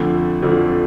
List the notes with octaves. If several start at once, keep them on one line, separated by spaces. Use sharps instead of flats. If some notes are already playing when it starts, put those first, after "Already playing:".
Already playing: F2 D3 F3 A3
F2 D3 F3 A3